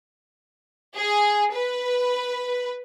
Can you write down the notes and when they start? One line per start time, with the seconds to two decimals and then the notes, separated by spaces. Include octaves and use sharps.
0.96 G#4
1.52 B4